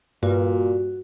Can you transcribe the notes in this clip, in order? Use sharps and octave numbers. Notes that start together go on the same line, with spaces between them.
G2 A#2 F#4